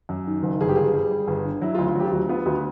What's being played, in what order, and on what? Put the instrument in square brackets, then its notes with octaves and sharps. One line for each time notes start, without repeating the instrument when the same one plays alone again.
[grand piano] F#2
D#3
F#1
[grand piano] G1 [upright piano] G#4
[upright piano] G4
[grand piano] G1 [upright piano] G#4
[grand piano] G3
G3
G1
D3
[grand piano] F#3 [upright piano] E4
[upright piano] F4
[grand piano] D2
[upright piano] F4
[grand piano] F#3 [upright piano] G4
[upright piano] F4
[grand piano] D2 [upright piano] F#4
[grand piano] B3 [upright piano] F4
[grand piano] D2 [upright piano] F#4